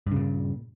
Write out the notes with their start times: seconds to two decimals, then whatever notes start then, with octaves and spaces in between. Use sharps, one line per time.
0.07 G2
0.11 C#3
0.16 A#2